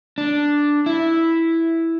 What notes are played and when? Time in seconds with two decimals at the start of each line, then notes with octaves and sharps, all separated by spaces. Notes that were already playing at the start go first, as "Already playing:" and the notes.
0.18 D4
0.86 E4